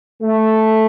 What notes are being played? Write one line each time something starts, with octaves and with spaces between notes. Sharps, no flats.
A3